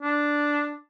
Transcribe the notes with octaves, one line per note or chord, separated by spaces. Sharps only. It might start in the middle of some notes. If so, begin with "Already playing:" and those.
D4